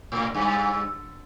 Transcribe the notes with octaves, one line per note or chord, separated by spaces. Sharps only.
A2
G2